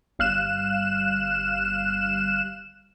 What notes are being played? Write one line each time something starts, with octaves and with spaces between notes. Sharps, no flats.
G1 G3 F5 F6 F#6 E7